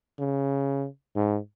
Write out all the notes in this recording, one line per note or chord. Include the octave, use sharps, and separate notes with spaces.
C#3
G#2